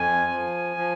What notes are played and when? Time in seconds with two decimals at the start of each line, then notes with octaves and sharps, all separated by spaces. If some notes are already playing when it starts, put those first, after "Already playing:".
Already playing: F2 G#5
0.31 F3
0.77 F3